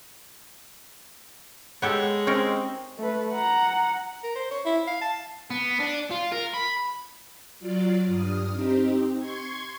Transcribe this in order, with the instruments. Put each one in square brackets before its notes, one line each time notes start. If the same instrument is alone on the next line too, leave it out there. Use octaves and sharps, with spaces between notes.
[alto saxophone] G#3 [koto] B3 G4 A4 [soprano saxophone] C#5
[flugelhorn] C4 [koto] C#4 D#4 A#4
[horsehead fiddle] A3 B4
F#5 A#5
[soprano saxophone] A#4
C5
C#5
E4
F5
A5
[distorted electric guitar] B3
D4
F4
A#4
B5
[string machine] F#3 F4 D5
G2 D#6 F6
C4 D#4 G4
C6 C#6 G#6